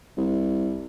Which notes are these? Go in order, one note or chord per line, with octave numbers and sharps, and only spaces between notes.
C2